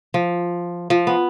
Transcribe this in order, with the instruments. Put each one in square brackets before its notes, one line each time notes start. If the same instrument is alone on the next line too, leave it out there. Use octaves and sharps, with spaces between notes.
[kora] F3
F3
B3